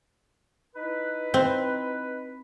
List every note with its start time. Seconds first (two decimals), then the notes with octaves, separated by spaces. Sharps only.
0.74 D#4 E4 B4
1.34 C4